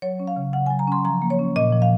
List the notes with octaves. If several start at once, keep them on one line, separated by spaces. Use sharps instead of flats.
F#3 C#5
C#4
F5
C#3
C#3 F#5
F#3 G#5
A#5
C#4 C6
F3 A#5
A#3
C#5
C#4
A#2 D#5
F3
F5